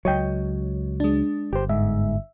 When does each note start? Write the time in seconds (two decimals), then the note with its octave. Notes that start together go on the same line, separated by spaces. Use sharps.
0.05 C#2 F#3 C#5 D#5 G5
1.00 G#3 D4
1.53 G1 G4 C5
1.69 G#2 E5